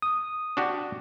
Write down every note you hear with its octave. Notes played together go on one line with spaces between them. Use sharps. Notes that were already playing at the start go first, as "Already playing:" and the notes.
D#6
D4 F#4 G4